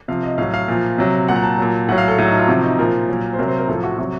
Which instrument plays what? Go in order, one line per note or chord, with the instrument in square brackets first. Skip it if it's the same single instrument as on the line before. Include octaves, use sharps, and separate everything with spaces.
[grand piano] C3 F3 F5
D#5
A2 F#3 F5
F5
A#2 F3
C3 F#3
A#2 F#3 F#5
A#5
A5
A#2 F#3
A2 F#5
F#3
F5
A4
A2 F#3
D#4
F4
C3 F3 F#4
D#4
A#2 F3 A#4
A#2 F#3
C5
C3 F#3 A#4
C5
A#4
A2 F3 A4
F#4
C3 F#3 F#4